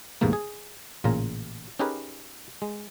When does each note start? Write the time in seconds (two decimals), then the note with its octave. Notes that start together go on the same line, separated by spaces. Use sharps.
0.21 A1 E2 G#2 C3 A#3
0.33 G#4
1.04 A1 A#2 C#3 F4 A#5
1.79 C#4 D#4 G4 G#4 A#4 B4
2.62 G#3